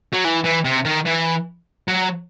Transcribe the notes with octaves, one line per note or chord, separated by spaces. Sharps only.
F#3
E3
E3
C3
D#3
E3
F#3